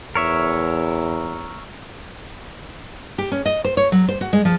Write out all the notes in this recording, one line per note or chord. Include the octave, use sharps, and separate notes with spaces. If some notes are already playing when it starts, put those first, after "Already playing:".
E2 A#4 C#5 E5
G4
C#4
D#5
C5
C#5
F#3
C5
F#4
G#3
F3